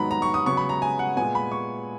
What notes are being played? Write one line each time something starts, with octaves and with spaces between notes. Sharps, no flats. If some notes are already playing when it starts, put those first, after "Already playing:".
Already playing: G#2 D#3 F#3 B3 A#5 B5
A#5
C#6
D#6
C#3 F#3 B3 C#6
B5
A#5
G#5
F#5
A#2 G#3 B3 G#5
B5
C#6